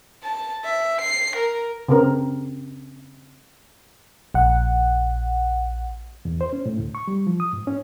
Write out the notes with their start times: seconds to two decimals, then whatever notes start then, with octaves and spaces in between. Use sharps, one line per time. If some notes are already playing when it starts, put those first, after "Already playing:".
0.24 A5
0.64 E5
1.01 C7
1.36 A#4
1.89 C#3 C4 A#4
4.34 A#1 F#5
6.25 E2
6.41 C5
6.53 C#4
6.66 A2
6.79 D2
6.95 C#6
7.08 G3
7.27 F3
7.40 D#6
7.53 G#2
7.67 C#4